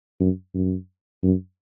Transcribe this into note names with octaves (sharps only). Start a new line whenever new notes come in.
F#2
F#2
F#2